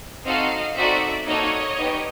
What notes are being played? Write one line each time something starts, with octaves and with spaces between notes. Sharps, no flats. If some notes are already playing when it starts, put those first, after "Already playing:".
C4 D#4 F#4 A4 D#5 F5
C4 D#4 F#4 A4 D5 E5
A#3 D#4 F#4 A4 C#5 D#5
B3 D#4 G4